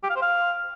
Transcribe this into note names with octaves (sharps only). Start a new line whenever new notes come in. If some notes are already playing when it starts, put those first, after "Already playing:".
G4
F5
C5
F5